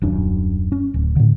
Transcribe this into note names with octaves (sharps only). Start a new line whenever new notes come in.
D#1 F#2 D4
C#4
D1
A2 D3